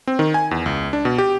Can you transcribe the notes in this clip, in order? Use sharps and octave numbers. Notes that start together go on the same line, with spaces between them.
C4
D#3
G#5
E2
C#2
D4
B2
G4